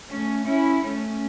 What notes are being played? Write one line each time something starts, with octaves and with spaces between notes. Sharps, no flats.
A3 C#4
C#4 E4
A3 C#4